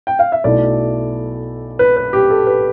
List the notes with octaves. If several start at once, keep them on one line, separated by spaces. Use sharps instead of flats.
G5
F5
E5
B1 B2 A3 E4 D5
B4
B4
G4
A4
B4